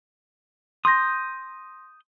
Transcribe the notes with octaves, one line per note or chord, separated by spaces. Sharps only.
C6 D#6 G6 A#6